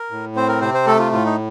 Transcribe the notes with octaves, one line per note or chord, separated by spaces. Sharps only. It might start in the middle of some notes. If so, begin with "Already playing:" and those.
Already playing: A#4
A2
C4 C5
A#4
C3 C5
C5
A3 A4
F4
A2 F4
D#4